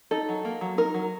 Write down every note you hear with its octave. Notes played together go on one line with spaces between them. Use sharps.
D#4 A4
F#3
A#3
F#3
D#4 A#4
F#3